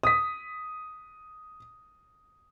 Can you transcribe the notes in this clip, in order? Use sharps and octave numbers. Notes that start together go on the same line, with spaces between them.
D#6 B6